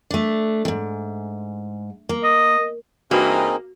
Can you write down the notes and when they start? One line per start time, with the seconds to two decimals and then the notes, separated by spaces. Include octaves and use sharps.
0.11 A3 D4
0.65 D#2 G#2
2.09 A#3
2.24 D#5
3.11 G2 E3 A#3 C4 D#4 F#4 G#4